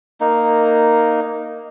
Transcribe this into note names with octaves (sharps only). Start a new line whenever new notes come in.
A#3 D#4